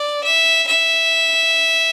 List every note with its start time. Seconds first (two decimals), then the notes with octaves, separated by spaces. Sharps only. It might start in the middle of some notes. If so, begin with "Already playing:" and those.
Already playing: D5
0.24 E5
0.68 E5